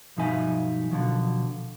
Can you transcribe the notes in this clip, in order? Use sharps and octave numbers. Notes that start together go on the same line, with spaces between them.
B1 G2 F3 D#4 E5 G#5
B2 D3 F3 F#3